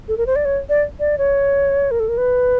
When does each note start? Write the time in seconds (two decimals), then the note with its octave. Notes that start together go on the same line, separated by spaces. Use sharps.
0.08 A4
0.17 A#4
0.27 C5
0.36 D5
0.45 C#5
0.69 D5
1.00 D5
1.18 C#5
1.91 A#4
2.00 A4
2.09 A#4
2.17 B4